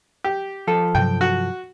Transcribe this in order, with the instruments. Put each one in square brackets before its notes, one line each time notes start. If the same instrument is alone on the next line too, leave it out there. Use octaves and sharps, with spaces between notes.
[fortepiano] G4
[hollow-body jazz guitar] F3 F4 A4
[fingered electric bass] G2 C3 F#3 [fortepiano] G5
[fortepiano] F#4